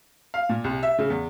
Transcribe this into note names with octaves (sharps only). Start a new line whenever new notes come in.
F5
A#2
C2
E5
C#3
E2